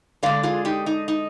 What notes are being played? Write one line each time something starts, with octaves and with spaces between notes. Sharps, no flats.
D3 G#3 D4 D5 F5
F4 G#4
D#4 G4
D#4
D#4